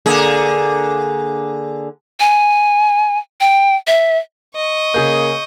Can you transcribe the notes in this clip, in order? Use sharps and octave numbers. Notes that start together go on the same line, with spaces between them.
D3 A#3 G#4
G#5
G5
E5
D#5 C#6
C#3 A#3 G#4 G6